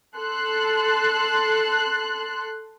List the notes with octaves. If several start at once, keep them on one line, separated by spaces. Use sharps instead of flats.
A4 C6 F#6